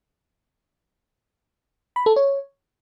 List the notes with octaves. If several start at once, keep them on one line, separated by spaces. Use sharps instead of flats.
B5
A4
C#5